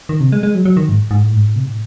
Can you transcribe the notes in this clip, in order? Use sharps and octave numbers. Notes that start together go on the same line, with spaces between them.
D#3
C3
G#3
G#3
F#3
F#3
D#3
G#2
G#2
A2
G#2
A2
C3
A2